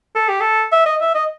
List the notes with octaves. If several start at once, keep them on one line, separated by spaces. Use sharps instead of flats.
A4
G4
A4
E5
D#5
E5
D#5